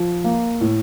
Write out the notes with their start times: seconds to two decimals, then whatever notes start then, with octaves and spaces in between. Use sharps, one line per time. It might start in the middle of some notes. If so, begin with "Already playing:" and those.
Already playing: F3
0.24 A#3
0.61 A2